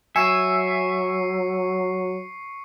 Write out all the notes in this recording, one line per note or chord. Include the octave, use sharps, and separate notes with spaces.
F#3 E5 G#5 C#6 C7 C#7